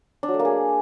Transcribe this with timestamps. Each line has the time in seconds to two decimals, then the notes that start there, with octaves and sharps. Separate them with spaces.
0.23 D4
0.28 F#3
0.34 A3
0.39 A#3
0.45 G#4